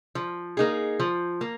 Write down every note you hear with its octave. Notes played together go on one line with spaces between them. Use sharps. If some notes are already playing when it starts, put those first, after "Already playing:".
F3
A#3 D#4 G#4
F3
A#3